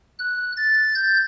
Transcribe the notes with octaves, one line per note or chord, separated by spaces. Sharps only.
F#6
A6
G6